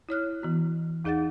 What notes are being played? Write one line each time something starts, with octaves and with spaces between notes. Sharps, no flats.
E4 C#5 F6 F#6
E3 B3 F#4
E2 D#4 G#4 D#5 F#5 A6